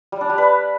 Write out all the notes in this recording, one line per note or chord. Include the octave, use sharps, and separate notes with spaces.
G3
D4
G3
B4